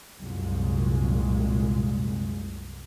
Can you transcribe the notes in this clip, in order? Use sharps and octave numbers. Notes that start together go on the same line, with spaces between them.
C2 F#2 A#2 G#3